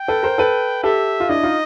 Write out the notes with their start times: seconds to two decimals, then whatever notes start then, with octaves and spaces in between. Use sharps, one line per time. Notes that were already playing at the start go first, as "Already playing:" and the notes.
Already playing: G5
0.08 A4 B4
0.23 A#4 C5
0.38 A4 B4
0.83 G4 A4 E5
1.20 F4
1.29 D4 E4 D#5
1.43 D#4 F4